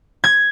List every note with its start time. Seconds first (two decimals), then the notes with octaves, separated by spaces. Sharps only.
0.24 G#6